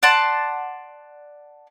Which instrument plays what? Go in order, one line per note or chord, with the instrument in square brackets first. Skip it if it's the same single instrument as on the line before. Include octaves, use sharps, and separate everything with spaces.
[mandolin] D5 F#5 A5 C6